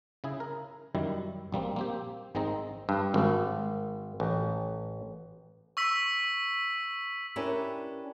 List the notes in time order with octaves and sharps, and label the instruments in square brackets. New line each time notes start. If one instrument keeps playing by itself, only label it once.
[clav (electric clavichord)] C#3 E4 G#4
A#4
F#2 D#3 G3 E4
A#1 G3 A#3 C4
A#3 C4 G4
G#1 D#3 G#3 C4 D#4 A#5
G2
G#1
A1
[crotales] C#6 E6 B6
[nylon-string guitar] C#4 D4 E4 G4 A#4 B4